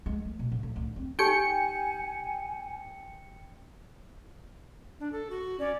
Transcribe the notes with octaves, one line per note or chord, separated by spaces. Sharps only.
G#3
A3
B2
A2
A2
D2
C4
D#4 G4 G5 G#5 C#7
D4
A4
F#4
C#4 D5